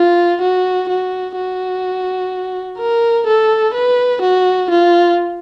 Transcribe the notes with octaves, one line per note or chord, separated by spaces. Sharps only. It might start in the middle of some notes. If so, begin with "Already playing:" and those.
Already playing: F4
F#4
F#4
F#4
A#4
A4
B4
F#4
F4